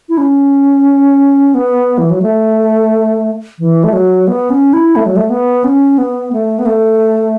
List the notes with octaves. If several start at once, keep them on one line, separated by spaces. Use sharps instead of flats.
E4
C#4
B3
E3
F#3
A3
E3
A3
F#3
B3
C#4
E4
A3
F#3
A3
B3
C#4
B3
A3
B3
A3